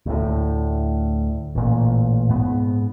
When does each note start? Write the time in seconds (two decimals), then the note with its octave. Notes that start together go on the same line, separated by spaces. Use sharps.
0.06 D2 A2
1.55 A1 A#2
2.29 G#2 B3